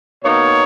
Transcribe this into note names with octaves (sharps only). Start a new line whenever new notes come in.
B2 A#3 D#4 C#5